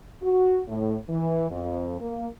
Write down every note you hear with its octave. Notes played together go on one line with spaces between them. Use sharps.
F#4
A2
E3
F2
A#3